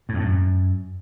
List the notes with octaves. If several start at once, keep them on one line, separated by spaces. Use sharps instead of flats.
A2
F2
A2
F#2